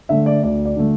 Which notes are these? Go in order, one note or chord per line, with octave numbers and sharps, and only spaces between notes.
D3 A3 E5
D5
D2 D5
D5
D3 A3